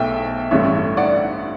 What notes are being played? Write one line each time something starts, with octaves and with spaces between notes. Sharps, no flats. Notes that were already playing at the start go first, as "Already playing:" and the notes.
Already playing: B1 B2 A3 E5 G5
A1 G2 D3 A3 C#5 E5
D5 F#5